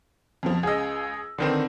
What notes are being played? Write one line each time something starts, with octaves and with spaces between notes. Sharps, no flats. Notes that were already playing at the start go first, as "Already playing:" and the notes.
F2 B2 F3
C#2 C#4 G#4 D#5 E6
D3 D#3 C4 B4